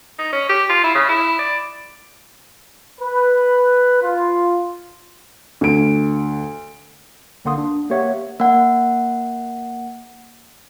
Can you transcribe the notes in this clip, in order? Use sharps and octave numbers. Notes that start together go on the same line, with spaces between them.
D#4
C#4
G4
F4
E4
C#3
E4
D5
B4
F4
D2 D7
A#1 D3 A#3 F#5 C6 D#6
D4
A#3 G4 C#5 E5 F#5
A#3 F#5